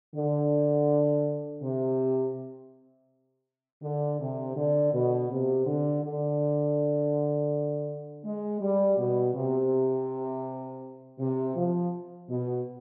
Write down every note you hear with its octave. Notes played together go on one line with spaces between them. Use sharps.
D3
C3
D3
C3
D3
B2
C3
D3
D3
G#3
G3
B2
C3
C3
F3
B2